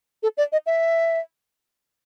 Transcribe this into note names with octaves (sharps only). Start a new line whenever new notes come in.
A4
D5
D#5
E5